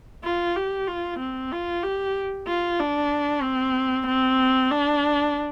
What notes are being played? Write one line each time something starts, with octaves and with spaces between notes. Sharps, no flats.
F4
G4
F4
C4
F4
G4
F4
D4
C4
C4
D4